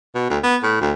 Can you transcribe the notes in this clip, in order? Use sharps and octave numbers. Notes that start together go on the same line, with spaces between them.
B2
D2
B3
A2
D2